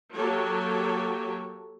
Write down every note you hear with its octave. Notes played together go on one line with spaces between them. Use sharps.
F#3 A#3 G4 A4 C#5